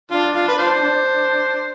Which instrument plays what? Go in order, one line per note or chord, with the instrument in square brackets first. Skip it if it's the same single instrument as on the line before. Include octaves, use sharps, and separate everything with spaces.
[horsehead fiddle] D4 [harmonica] F4
[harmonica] F4
B4
F4 C5
[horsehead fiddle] D4